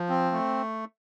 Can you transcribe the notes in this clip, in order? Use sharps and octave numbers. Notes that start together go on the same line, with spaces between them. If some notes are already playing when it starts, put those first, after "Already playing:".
Already playing: F3
C4
A3